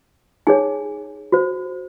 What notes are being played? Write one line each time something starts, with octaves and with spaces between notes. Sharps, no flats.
D#4 G#4 C#5 G#5
F#4 C5